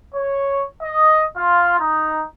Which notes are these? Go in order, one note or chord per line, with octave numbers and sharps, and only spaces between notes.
C#5
D#5
F4
D#4